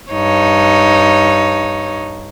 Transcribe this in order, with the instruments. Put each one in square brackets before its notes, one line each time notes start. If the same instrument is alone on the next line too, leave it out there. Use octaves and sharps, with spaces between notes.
[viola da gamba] G2 D#4 C#5